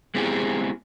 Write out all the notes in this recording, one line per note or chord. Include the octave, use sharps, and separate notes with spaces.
G#3 B3 C4 E4 G4 G#4